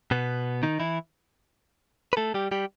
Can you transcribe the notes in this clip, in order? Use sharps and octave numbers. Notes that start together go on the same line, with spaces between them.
B2 B3
D#3 D#4
E3 E4
B4
A3 A4
G3 G4
G3 G4